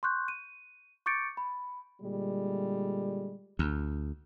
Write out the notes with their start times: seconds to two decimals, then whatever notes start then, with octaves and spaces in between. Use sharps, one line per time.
0.03 C6 C#6 F#6 G6
0.28 D#7
1.06 C#6 D6 G6 A6 C#7 D7
1.37 B5
2.02 A#2 D3 G3 G#3
3.59 D2